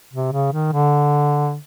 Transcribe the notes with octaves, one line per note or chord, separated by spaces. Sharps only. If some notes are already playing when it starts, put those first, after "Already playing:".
C3
C#3
D#3
D3